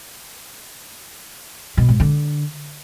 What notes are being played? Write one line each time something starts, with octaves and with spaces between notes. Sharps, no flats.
B2
G#2
D3